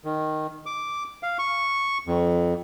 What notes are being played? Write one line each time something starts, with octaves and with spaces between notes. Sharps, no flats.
D#3
D6
F5
C#6
F2